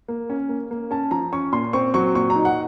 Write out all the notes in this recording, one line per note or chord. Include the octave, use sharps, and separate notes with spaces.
A#3
C#4
A#3
A#3
C#4 A5
F3 A#5
C#4 C#6
A#2 C6
C4 C#6
F#3 C#6
A#2 C#6
A#5
D#4
F#5